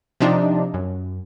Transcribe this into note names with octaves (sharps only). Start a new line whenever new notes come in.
C3 F3 D4 D#4
F#2